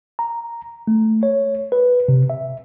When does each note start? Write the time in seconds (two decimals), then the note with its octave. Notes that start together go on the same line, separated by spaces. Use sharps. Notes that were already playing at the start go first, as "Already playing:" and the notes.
0.19 A#5
0.87 A3
1.23 C#5
1.72 B4
2.08 C3
2.30 E5